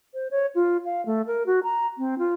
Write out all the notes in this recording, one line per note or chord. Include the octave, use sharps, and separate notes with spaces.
C5
C#5
F4
F5
A3
A#4
F#4
A#5
C4
F4